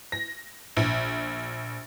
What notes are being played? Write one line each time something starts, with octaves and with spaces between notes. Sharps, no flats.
A#6
A#1